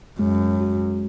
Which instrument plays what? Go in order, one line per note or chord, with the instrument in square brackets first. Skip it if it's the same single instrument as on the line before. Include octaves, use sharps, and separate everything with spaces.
[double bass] F#2 [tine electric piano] G#3
[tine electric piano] F#4